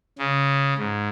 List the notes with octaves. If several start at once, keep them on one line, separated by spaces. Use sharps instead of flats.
C#3
G#2